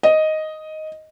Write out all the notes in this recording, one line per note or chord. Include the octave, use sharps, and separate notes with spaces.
D#5